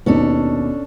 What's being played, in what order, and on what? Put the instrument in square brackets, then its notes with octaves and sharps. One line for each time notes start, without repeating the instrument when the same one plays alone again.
[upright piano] D#2 B2 [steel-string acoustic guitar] C#4 D4 A4